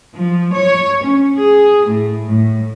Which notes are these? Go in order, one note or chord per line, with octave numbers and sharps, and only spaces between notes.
F3
C#5
C#4
G#4
A2
A2